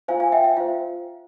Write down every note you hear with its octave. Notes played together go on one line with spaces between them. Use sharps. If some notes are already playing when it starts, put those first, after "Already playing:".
F4 C5 F5 G#5
F5 G#5
E5 G5
E5
F4 C5 F5